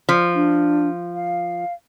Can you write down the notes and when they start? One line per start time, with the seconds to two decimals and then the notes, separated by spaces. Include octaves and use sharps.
0.09 F3
0.35 D4
1.15 F5